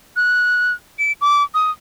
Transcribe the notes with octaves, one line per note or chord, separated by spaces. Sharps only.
F#6
D7
D6
D#6